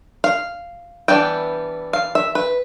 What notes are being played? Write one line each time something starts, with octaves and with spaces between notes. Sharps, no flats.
F5
E3 G3 B3 D4 G5
F5
E5
B4